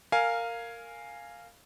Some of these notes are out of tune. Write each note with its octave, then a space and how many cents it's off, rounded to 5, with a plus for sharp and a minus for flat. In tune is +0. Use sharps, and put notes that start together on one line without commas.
A#4 -15 F5 +0 G#5 +0